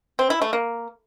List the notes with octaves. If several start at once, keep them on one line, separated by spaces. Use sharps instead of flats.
C4
E4
A3
A#3